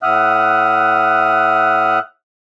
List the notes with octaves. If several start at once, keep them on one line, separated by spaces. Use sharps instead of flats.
A2 E5 F#5 D#6 F6 F#6